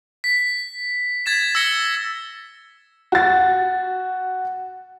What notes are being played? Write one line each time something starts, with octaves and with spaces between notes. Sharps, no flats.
B6
G#6 A6 B6 E7
E6 A6 A#6 C#7 G7
F#4 A6